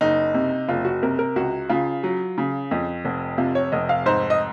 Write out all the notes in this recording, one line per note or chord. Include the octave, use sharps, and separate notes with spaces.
F#1 D#4
C3
F#1 F4
F#4
C3 A#4
A#4
C#2 F#4
C#3 F4
F#3
C#3
F2
F1
C3 F4
C#5
F1 D#5
F5
G#2 C5
D#5